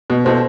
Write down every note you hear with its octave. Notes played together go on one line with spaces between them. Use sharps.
B2
B2 E4 A4 C5